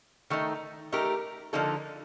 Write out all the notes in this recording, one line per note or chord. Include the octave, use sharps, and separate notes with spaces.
D#3 A3 D#4
A3 D#4 G4 A#4
D3 F3 A#3 D#4 A4